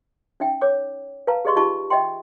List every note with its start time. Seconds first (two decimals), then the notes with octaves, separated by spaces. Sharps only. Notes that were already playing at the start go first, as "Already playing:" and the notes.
0.40 C#4 D#4 E5 G5
0.61 C#5 D6
1.27 B4 F5 A5 A#5
1.45 G4 G#4 D5 D#5 C6 C#6
1.56 D#4 F4 G4 D#5 A5 C#6
1.90 D#5 E5 G5 C6